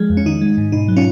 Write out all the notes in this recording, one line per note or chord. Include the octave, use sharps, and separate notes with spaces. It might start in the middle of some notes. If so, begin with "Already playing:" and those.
Already playing: F3 G#3 G#4
F2
C#4
D#3 D#4
G#3
G#2
B2 D#4
F#3
C#4 F4